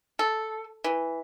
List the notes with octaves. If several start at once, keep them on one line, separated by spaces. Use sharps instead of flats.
A4
E3